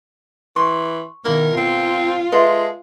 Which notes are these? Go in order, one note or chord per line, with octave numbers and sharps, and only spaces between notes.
E3 C6 C#6
B2 D#3 E4 A#4 F5
C4 F4 A4
G#3 A4 B4 E5 C6